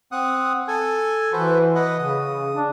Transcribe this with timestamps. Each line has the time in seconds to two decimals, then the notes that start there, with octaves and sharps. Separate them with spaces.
0.12 C4 F#5 D#6
0.68 A4 G#5
1.33 E3 F#4 B4 C5
1.75 B4 D#5 F#5
1.98 C#3 D#6
2.56 D4